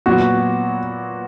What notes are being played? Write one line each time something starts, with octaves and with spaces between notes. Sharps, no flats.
A#2 F#3 B3 F#4